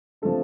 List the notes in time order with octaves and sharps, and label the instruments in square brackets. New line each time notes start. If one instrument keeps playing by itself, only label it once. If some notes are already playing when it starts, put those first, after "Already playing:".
[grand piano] C3 F3 A3 D4 A4